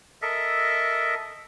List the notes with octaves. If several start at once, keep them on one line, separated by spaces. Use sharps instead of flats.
A4 A#4 D#5 E5